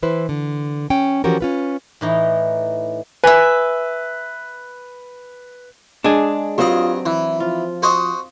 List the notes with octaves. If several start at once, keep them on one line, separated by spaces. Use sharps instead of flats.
E3 E4 B4 C5
D3
C#4 G5
E3 F3 C#4 F#4 G4 A#4
C#4 F4 B4
A2 E3 D#4
B4 E5 G#5
G#3 D4 G#4
G2 F#3 C4 F4 C5 D#5
E3 E4
F3 F4
F#4 C5 D#5